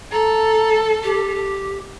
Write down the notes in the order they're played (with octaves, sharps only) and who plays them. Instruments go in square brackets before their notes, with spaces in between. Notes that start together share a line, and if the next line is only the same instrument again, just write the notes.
[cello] A4 [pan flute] A#5
[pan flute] G4